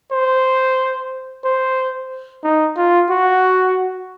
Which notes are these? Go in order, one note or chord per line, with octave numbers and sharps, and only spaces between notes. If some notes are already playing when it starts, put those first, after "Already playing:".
C5
C5
D#4
F4
F#4